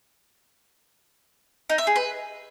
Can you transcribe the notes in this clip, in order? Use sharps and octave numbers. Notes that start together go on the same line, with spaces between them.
D#4
E5
G#4
B4